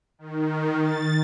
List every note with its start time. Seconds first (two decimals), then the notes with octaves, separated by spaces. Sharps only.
0.19 D#3
0.82 A6